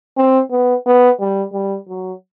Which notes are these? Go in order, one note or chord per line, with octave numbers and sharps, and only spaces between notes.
C4
B3
B3
G3
G3
F#3